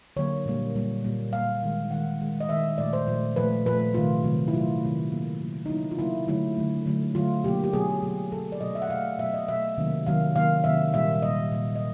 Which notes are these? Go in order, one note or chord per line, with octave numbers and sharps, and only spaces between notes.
D3 F#3 A#3 C#5
A#2 G3 A#3
A#2 G3 A#3
A#2 G3 A#3
A#2 G3 A#3 F5
D#3 G#3
D#3 G#3 F#5
D#3 G#3
D#5
D#3 G#3 E5
A#2 F3 A3 D5
C5
A#2 F3 A3
A#2 F3 A3 B4
A#2 F3 A3 B4
C3 D#3 F#3 A3 F4
C3 D#3 F#3 A3
E4
C3 D#3 F#3 A3 F4
C3 D#3 F#3 A3
C#3 F#3 A#3
C#3 F#3 A#3
D#4
C#3 F#3 A#3 E4
F4
C#3 F#3 A#3 E4
D3 F#3 A3 E4
D3 F#3 A3
D3 F#3 A3
D3 F#3 A3 F4
B2 F#3 A#3 G4
G4
B2 F#3 A#3 G#4
B2 F#3 A#3
B2 F#3 A#3 A4
D5
B2 F#3 A3 D#5
E5
F#5
B2 F#3 A3 F5
B2 F#3 A3 E5
D#5
B2 F#3 A3 E5
C3 D#3 F#3 A#3
C3 D#3 F#3 A#3 F5
C3 D#3 F#3 A#3 F5
C3 D#3 F#3 A#3 E5
A#2 G3 A#3 E5
A#2 G3 A#3 D#5
A#2 G3 A#3
D#5